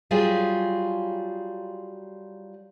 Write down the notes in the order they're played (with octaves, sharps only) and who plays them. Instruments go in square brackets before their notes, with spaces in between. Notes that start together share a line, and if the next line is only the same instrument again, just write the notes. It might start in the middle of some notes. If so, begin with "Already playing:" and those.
[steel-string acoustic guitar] F#3 G3 F4 G#4